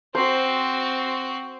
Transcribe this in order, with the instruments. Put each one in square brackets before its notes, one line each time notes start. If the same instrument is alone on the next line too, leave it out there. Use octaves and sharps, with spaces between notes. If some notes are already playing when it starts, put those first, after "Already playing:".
[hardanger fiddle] C4 F#4 [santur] C5